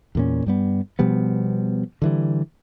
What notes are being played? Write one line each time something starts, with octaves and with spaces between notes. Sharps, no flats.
E2 A#2 C#4
G2 G3 B3
B2 F3 G3 B3
D3 E3 G3